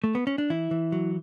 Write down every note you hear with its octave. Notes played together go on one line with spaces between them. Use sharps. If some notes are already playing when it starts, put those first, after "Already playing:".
A3
B3
C#4
D4
E3 E4
E3
F#3